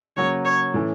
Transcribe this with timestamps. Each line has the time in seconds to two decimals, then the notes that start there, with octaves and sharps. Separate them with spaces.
0.16 C#3 F#3 A#3 C#5
0.45 C#5
0.74 A2 E3 A3 C#4